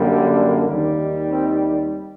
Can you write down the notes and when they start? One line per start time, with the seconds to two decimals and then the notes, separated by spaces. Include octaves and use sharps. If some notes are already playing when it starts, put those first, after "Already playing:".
Already playing: F#2 D3 G3 A#3
0.65 D#2 D#3 G3
1.29 C4